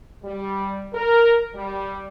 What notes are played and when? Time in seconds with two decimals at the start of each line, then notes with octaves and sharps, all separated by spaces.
0.23 G3
0.93 A#4
1.54 G3